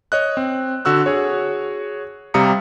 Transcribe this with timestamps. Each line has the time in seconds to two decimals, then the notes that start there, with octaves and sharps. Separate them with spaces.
0.12 C#5 D#5 F#6
0.37 C4
0.85 D3 F#4 E6 F#6
1.06 F#4 G#4 C#5
2.34 C3 G3 F5 A#5 D#6 C#7